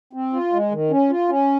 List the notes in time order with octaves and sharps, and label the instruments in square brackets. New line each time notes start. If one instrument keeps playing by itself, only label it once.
[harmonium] C4
F4
G#3
D#3
C#4
F4
C#4